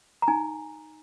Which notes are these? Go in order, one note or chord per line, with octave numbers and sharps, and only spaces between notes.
A#5
D#4 G#5